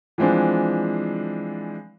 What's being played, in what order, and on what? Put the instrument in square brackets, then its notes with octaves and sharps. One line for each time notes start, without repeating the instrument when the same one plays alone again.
[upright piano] E3 F3 G#3 C4 D4